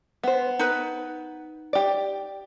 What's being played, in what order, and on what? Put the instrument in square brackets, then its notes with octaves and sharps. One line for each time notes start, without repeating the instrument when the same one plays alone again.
[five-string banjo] B3 C5
[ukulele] D#4 B4
[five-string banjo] G4 D5